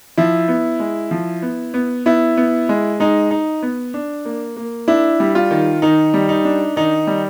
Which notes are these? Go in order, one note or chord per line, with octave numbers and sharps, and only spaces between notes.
F3 E4
B3
G#3
F3
B3
B3
B3 E4
B3
G#3
G#3 D#4
D#4
B3
D4
A#3
A#3
D4 E4
G3
F4
D#3
D#3 D#4
G3
D#4
D4
D#3 D#4
G3